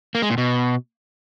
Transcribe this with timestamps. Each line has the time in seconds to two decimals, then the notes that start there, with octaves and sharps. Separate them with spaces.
0.15 A#3
0.22 G#3
0.30 A#2
0.38 B2